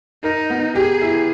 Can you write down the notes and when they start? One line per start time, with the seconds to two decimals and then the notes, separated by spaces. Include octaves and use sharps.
0.23 D#4 A#4
0.50 B3
0.75 G4 G#4
1.01 E4